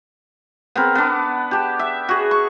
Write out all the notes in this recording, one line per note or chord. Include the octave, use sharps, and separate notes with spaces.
B3 C4 A#4
B3 D4
G4 A5
E5
F#4 G#4
C#6